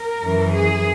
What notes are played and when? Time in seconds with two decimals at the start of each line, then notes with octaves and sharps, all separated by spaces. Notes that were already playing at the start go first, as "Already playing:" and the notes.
Already playing: A#4
0.22 F#2 E3
0.53 G#4